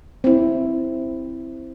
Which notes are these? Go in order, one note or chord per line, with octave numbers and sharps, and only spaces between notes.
C4 E4